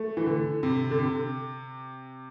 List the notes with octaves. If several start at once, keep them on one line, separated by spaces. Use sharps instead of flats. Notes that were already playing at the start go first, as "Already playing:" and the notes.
Already playing: A3
E3
D3
C3
D3
C3